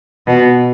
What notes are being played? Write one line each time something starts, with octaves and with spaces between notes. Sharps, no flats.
B2